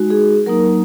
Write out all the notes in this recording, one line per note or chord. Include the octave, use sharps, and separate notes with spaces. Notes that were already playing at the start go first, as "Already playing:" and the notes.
Already playing: G#3 D#4 F#4
G#4
F#3 A#3 D#4 A#4